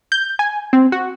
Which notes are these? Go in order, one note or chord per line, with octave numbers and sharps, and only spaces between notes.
G6
G#5
C4
F#4